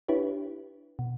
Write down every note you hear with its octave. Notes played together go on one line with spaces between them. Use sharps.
D4 E4 G4 B4 C#5
B2